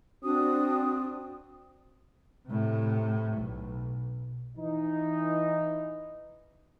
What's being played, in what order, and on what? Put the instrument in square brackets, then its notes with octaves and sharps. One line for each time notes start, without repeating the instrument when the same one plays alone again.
[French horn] C4 [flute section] D4 F#4 D#6
[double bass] A2 C3
B1
[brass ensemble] E3 D#4